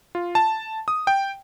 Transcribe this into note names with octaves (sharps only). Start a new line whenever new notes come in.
F4
A5
D#6
G5